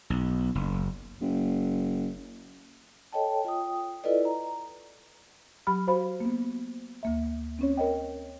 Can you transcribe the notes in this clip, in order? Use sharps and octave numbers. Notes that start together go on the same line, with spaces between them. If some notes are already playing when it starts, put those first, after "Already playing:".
B1
F#1
F#1
A4 C#5 D#5 G5 A5
F4 G5 D#6
E4 F4 A4 B4 D5 D#5
A#5
F#3 G4 B5 F6
F#4 C5 F5 B5
A#3 B3
D2 A#3 E5
C4 C#4 C#5
A#4 C#5 D#5 G5